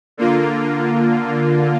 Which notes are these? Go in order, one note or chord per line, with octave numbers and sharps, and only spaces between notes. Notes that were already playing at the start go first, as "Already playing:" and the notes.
D3 A#3 F4